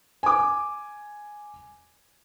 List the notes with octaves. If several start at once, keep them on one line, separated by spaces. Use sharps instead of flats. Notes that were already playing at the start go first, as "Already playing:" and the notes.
G#5 D6